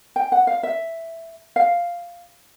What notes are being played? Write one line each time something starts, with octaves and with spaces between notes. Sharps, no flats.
G5
F#5
F5
E5
F5